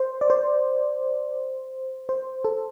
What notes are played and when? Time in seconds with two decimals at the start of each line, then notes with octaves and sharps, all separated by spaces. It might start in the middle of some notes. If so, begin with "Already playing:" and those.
Already playing: C5
0.21 D5
0.30 C5
2.09 C5
2.45 A4